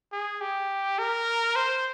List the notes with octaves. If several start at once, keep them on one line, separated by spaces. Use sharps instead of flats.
G#4
G4
A#4
C5